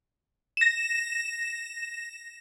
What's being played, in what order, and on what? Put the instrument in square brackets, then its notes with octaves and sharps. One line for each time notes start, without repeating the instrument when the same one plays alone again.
[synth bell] A#6 E7